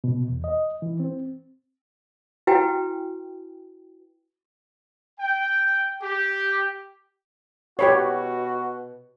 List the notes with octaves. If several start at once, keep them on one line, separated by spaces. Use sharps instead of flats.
B2
E2
D#5
E3
C4
E4 F#4 B4 G5 G#5
G5
G4
B2 F#4 G4 B4 C#5